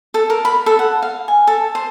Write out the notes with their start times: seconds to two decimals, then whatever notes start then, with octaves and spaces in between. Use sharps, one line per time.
0.14 A4
0.30 A#4
0.45 B5
0.66 A4
0.79 F#5
1.02 F5
1.28 G#5
1.47 A4
1.75 C5